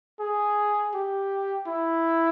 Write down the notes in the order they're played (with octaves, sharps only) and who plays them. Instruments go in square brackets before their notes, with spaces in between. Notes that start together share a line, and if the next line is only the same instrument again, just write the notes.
[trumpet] G#4
G4
E4